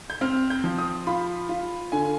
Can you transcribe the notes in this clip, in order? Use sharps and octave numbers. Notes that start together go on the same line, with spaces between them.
G6
C4 F6
G6
F3
D#6
F4 B5
F4
D3 G#5